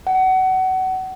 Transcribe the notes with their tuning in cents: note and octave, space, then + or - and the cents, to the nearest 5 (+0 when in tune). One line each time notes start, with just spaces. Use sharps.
F#5 +25